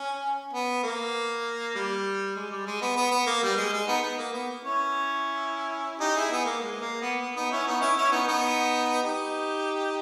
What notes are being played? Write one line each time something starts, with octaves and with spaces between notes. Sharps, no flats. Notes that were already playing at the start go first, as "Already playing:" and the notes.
Already playing: C#4
B3
A#3
G3
G#3
G3
G#3
B3
B3
B3
A#3
G3
G#3
G#3
B3 D#4
B3
A#3
B3
C#4 E4
D#4 G4
E4 G#4
B3
A#3
G#3
A#3
B3
B3
B3 D#4
C#4 E4
B3 D#4
C#4 E4
C#4 E4
B3 D#4
B3 D#4
D#4 G4